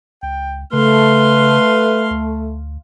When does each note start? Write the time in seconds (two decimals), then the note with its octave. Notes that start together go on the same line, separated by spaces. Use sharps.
0.23 C#2 G5
0.73 C#3 A3 B4 F5 C6
2.11 D2